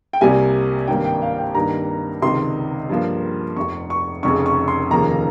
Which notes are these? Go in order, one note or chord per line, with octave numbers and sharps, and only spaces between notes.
G5
C2 C3 G3 A#3 G#5
G#1 G2 G3 A#3 G5
G5
F5
G5
G2 D#3 A#3 A#5
C#2 C3 D#3 C6
G2 F3 A#3
F1 F2 C3 C#6
C#6
F1 F2 C#3 C#6
C#6
C6
F1 D#2 C#3 F3 A#3 A#5